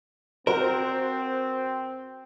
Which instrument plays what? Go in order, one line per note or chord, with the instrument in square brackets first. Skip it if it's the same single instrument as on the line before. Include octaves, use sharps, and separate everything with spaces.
[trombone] C4 [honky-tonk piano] F#4 C5 [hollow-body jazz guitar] A#4